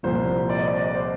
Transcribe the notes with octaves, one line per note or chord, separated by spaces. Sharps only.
C2 A#2 F3 C5
D5
D#5
D5
D5
C5